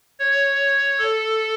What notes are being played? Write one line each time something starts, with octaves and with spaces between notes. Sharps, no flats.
C#5
A4